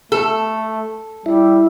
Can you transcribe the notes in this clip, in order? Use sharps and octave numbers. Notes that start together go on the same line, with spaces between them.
A3 A4
G3 E4